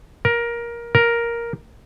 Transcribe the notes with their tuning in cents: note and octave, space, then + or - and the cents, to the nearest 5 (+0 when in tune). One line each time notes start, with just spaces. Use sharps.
A#4 +15
A#4 +5